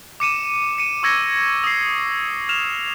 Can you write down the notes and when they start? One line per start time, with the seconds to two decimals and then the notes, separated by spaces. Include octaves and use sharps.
0.20 D6 C#7 D#7 E7
0.78 C#7 D#7
1.03 C#6 E6 G#6 A#6 C#7 G7
1.64 D#6 C7
2.49 F6 E7 F7